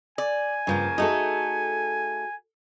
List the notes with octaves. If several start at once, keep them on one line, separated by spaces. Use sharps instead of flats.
D5 G#5
G2 C#3 F3 A#3 F4
A3 D#4 F#4 G#4 A4